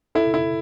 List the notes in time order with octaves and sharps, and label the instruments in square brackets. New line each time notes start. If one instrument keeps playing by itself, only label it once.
[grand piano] E4 [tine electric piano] A4
[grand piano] E4